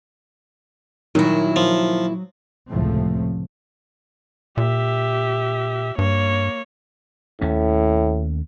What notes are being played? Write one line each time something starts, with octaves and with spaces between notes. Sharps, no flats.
A#2 D#3 F#3 E4
F3
F1 C#2 A2 F3 A3 C4
A#2 G4 E5
G2 A#3 C#5
D#2 A2 A3 C#4